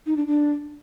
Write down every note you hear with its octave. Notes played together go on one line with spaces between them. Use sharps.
D#4
D4
D4